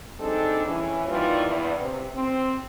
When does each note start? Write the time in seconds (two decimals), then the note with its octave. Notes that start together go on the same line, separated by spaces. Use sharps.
0.19 G3 C4 D4 D#4 G#4 A4
0.66 E3 C#4
1.07 A#2 D#3 E3 G3 F4
1.47 E2 G2
1.81 C3
2.14 C4